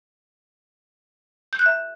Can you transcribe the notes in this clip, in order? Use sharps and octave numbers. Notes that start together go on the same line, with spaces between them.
G6
F#6
E5